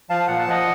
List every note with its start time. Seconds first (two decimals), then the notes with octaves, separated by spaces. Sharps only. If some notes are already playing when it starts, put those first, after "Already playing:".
0.10 F3 F5 A5
0.28 A#2 F#5
0.39 A5
0.47 F3 D#5 F#5